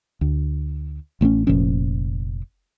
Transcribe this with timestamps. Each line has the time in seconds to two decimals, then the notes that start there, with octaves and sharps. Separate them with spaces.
0.21 D2
1.21 A1 A3 C4 C#4
1.47 F1 A#2 F3 C#4